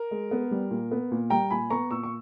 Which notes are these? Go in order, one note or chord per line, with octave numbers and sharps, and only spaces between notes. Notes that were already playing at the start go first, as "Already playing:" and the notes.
Already playing: A#4
G#3
B3
G3
A#2
B3
A#2
G3 G5 A#5
A#2 G#5 B5
B3 A#5 C#6
A#2 C#6 E6
C#6